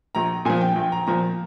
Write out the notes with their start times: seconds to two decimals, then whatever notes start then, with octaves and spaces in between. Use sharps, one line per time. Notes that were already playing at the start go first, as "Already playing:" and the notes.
0.15 A#1 A#5
0.45 A#2 F3 G#5
0.61 G5
0.76 A#1 G5
0.92 A#5
1.07 A#2 F3 A#5